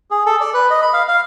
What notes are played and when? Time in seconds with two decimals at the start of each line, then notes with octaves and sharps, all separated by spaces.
0.11 G#4
0.26 A4
0.41 D5
0.54 B4
0.70 D#5
0.82 B5
0.93 F5
1.08 F5